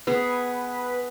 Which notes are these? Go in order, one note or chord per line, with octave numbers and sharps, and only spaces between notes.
B3 G#4 B4